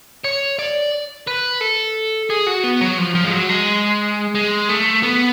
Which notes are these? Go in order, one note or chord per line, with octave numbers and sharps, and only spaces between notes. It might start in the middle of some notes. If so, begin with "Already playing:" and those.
C#5
D5
B4
A4
G#4
F#4
B3
F#3
F3
F3
G#3
F#3
G#3
G#3
A3
B3